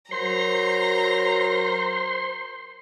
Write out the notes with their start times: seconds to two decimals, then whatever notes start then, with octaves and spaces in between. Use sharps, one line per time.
0.11 F#3 A#4 C5 A#5 C6